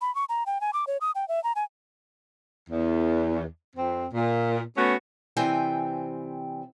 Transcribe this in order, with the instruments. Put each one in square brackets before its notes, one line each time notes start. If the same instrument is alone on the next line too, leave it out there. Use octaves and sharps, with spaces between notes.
[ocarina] B5
C#6
A#5
G5
G#5
D6
C#5
D#6
G5
E5
A#5
G#5
[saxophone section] E2
F2 C4
A#2
A3 B3 C#4 F#4
[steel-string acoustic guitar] C3 E3 G3 C4 G5 G#5